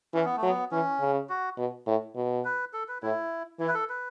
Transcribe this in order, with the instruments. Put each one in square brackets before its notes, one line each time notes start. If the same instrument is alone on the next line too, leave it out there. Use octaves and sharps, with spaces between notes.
[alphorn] E3 [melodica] C#4
[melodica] B3
A3
[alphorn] F#3
[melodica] B3
[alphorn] E3 [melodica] C#4
[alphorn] C#3
[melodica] F#4
[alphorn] B2
A2
B2
[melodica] B4
A4
B4
[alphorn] A2 [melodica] E4
[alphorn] E3 [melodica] E4
[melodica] B4
A4
B4